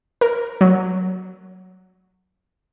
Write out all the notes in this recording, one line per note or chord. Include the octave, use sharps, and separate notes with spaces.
A#4
F#3